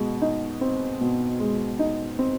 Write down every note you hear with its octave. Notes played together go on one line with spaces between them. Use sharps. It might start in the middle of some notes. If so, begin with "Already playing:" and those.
Already playing: B2 G#3
D#4
C4
B2
G#3
D#4
C4